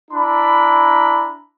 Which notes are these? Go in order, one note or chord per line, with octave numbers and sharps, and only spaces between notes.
D4 E4 A#5 B5